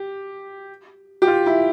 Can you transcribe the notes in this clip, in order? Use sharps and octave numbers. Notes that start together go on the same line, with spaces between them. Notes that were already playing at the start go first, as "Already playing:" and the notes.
Already playing: G4
G4
F4
E4